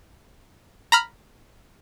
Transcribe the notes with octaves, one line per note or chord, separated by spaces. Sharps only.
A#5 B5 F6